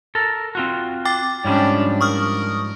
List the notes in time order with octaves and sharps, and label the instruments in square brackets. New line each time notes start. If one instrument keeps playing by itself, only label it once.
[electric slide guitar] A4 A#4
C4 F4 F#4
[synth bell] G5 D6 A6
[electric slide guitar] G#2 F3 G3 [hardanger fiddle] C#4 D4
[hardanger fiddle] A#4 [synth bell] C#6 D#6 F6